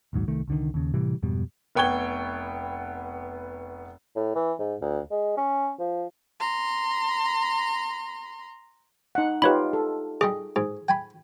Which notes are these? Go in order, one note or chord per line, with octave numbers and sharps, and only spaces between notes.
A#1 D#2 G#2 F#3
C2 D#3 A3
C2 D3 D#3
D#2 C#3
A2 C3 E3 G3
F2 G#2 B2 G3
F1 B3 G5 C#6 G#6 G7
A2
E3
G#2
D2
G#3
C#4
F3
A#5 C6
D#4 F#5
D#4 F4 G4 B4 C#5 B5
A4
G3 G#4 D#5 D6
G#2 G#4
G5 G#5 B5